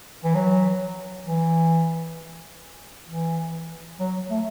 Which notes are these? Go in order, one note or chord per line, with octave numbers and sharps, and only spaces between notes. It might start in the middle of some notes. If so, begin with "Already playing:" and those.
E3
F#3
E3
E3
F#3
A3